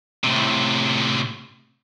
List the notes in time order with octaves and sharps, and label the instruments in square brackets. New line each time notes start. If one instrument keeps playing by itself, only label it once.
[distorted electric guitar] A2 C3